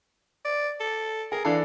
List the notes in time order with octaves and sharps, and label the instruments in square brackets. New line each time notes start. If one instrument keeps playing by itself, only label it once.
[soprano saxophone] D5
A4
[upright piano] G#4 [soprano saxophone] A#4
[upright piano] E3 D4 A4 [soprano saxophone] F5